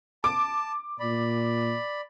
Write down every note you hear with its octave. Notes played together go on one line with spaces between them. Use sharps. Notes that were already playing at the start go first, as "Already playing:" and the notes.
A5 D6
A#2 D5 B5